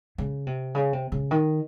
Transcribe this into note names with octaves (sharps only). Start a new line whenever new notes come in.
C#3
C3
C#3
C3
C#3
D#3